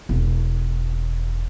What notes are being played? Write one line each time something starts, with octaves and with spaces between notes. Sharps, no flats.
E1